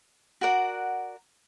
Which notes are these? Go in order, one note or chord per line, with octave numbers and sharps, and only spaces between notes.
F#4 A#4 D5 F#5